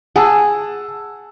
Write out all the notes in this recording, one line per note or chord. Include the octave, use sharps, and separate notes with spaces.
G#4 F#5 A5 E6